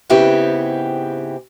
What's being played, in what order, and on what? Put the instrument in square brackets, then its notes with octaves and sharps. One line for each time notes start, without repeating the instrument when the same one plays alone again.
[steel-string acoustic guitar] G#2 C#3 B3 C4 E4 G4